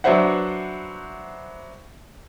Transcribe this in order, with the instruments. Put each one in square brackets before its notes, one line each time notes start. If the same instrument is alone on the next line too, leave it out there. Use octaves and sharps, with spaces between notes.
[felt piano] F#3 D4 B4 C5 E5 F#5